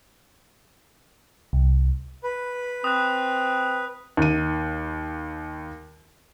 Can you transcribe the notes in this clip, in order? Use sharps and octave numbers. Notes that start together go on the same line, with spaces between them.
C2
B4
C4 D#6 F#6
D#2 D#7